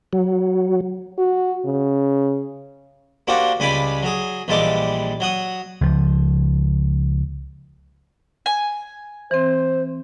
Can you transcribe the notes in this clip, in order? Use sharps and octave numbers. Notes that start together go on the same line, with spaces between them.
F#3
F#4
C#3
A#3 D4 F#4 G4 C5 F#5
C#2 G3 G#5 B5 D6
F#3 G#4
A#1 E3 G3 G#3 A5 D6
F#3 F#5 D#6
C#2 F3
G#5
E3 C4 C5